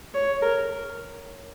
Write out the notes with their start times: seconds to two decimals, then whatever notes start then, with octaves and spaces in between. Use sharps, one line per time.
0.14 C#5
0.42 A#4